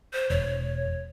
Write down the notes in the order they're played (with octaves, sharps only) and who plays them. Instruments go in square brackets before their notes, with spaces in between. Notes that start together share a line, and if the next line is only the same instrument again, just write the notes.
[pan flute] C5
[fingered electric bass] E1 [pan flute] C#5